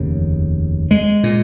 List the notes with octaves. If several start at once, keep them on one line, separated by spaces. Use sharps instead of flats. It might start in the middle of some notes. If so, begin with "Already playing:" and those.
Already playing: F1 D#2 C#3
G#3
A#2